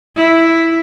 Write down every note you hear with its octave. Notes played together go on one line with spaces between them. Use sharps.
E4